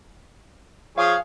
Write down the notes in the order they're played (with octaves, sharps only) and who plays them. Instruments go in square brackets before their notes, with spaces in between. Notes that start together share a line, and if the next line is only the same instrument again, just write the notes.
[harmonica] F3 G#4 C#5 [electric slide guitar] F5